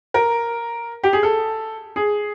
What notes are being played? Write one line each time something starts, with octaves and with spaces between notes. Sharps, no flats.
A#4
G4
G#4
A4
G#4